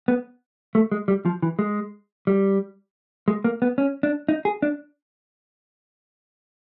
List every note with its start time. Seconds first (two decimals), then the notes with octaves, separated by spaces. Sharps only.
0.08 B3
0.75 A3
0.92 G#3
1.08 G3
1.25 F3
1.43 E3
1.59 G#3
2.27 G3
3.28 G#3
3.44 A#3
3.62 B3
3.78 C#4
4.03 D4
4.29 D#4
4.45 G#4
4.62 D4